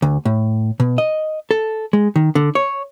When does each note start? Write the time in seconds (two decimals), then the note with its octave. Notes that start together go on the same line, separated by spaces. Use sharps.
0.02 D2
0.25 A2
0.80 B2
0.98 D#5
1.51 A4
1.93 G#3
2.16 D#3
2.35 D3
2.55 C#5